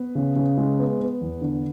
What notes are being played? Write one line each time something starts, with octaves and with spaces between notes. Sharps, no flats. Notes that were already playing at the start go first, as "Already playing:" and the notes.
Already playing: B3 B4
C#3
C#3
G#3
B3
B3
E2
D3